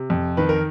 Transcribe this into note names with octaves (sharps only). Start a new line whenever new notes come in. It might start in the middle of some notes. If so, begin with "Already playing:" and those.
Already playing: C3
F2
D#3 B4
A#4